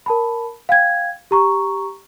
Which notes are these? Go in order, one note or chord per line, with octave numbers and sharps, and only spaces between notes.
A#4 A5 B5
F5 G5 G#6
G4 A#5 C#6